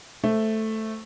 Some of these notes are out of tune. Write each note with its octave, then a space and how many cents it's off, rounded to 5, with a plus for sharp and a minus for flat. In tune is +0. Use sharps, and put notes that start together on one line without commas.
A3 +0 C5 +0